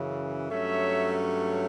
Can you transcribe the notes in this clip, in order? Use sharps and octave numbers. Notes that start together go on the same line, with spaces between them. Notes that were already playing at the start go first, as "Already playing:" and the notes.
Already playing: F#2 C#3 E3
G2 F#3 A3 C#4 C#5 E5